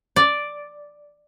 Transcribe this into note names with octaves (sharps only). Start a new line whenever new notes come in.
D5